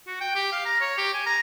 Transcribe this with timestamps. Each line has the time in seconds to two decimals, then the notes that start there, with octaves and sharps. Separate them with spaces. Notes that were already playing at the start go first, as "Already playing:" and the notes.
0.07 F#4
0.21 G5
0.35 G4
0.53 F5
0.66 A#5
0.81 C#5
0.98 G4
1.15 G#5
1.26 A#5